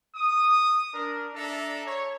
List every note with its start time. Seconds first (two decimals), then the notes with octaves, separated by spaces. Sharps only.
0.15 D#6
0.92 D4 A#4
1.34 D4 A4 D5 E5 A#5
1.86 C#5